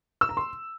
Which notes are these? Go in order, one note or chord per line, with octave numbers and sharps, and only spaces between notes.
E6
A#5
C6